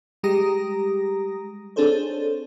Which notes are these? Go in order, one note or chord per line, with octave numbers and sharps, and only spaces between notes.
G3 G#3 G4 A#5 D#6 A#6
C4 D4 G#4 A4 C5 C#5